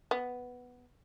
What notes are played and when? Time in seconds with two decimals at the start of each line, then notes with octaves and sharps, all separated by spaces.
0.11 B3